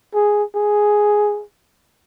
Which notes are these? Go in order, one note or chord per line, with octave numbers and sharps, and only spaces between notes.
G#4
G#4